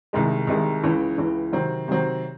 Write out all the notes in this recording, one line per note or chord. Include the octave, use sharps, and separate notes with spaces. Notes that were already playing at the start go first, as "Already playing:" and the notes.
C2 C3 D#3 G#3
C2 C3 D#3 G#3
C#2 C#3 E3
C#2 C#3 E3
C3 D#3 F#3 C4
C3 D#3 F#3 C4